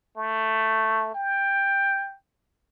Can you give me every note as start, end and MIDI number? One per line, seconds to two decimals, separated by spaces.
0.17 1.12 57
1.14 2.15 79